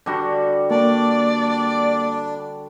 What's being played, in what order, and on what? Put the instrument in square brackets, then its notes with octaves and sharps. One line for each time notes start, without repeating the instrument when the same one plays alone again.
[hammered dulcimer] D3 G3 F#4
[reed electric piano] A#3 [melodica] D4 [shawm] D5